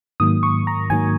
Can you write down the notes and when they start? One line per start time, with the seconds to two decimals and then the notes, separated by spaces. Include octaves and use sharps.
0.20 G#2 D#3 F#3 A#3 D#6
0.43 C#6
0.67 A#5
0.90 G#2 D#3 F#3 A#3 G#5